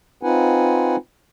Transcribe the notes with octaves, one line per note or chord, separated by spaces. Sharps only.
C4 D#4 F4 B4 F#5 G#5